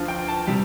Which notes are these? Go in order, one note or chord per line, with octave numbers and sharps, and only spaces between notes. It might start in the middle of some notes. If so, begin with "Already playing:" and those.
Already playing: D2 D3 F3 F5
G5
A5
C3 G3